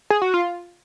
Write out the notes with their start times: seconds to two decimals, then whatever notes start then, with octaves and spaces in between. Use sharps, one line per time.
0.10 G#4
0.22 F#4
0.34 F4